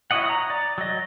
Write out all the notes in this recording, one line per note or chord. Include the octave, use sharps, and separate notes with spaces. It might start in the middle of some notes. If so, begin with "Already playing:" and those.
E4 F#4 C#5 D#5 F#5
A#5 D#6
D5
F#3 D#5